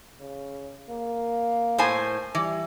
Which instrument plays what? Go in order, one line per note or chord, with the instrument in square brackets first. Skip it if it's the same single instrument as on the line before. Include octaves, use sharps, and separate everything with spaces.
[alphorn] C#3
A#3
[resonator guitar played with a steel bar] A2 C5 G#5
[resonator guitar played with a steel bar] E3 [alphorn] G3